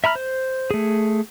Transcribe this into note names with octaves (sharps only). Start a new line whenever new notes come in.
E5 A#5 B5 F6
C5
A3 G#4